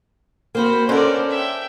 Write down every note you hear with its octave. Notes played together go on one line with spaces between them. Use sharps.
A#3 C4 F#4 C5 B5
B2 D3 C#4 A4 A#4 C5 D5
E5 G5